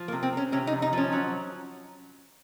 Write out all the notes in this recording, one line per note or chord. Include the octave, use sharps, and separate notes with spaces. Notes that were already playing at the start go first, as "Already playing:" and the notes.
Already playing: F3
A#3
C3
C4
C3 C#4
C3 C#4
D#4
F2
D#4
F3 C#4
F#3